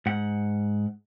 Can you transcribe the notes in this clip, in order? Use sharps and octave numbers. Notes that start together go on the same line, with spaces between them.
G#2 F#5